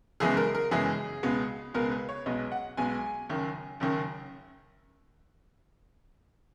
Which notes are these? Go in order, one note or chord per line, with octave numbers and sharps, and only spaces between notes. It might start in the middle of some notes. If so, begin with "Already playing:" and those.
F#1 F#2 E3 G#3 B3 G#4
A#4
A#4
F#1 F#2 E3 G#3 B3 G#4
C#2 B2 G#3 B3
C#2 B2 G#3 B3 A#4
B4
C#5
B1 B2 G#3 B3 D#5
F#5
B1 B2 G#3 B3 G#5
F#1 F#2 D#3
F#1 F#2 D#3